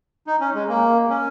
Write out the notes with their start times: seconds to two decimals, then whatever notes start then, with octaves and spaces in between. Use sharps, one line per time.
0.27 D#4
0.41 C#4
0.54 G#3
0.69 A#3
1.10 C#4